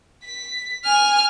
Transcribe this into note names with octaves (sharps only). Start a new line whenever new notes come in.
B6
G#5 F6